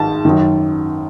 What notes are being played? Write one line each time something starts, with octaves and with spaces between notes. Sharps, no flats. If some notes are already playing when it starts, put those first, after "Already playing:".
Already playing: G#2 D#3 A5
F#2 D#3